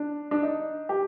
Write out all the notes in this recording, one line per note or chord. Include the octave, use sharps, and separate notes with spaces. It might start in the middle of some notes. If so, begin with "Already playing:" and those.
Already playing: D4
D4
D#4
G4